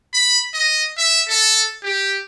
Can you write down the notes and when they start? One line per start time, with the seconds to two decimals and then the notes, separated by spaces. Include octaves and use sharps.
0.14 B5
0.54 D#5
0.98 E5
1.29 A4
1.83 G4